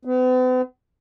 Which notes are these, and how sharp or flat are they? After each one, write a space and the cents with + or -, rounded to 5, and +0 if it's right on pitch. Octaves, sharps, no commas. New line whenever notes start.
B3 +45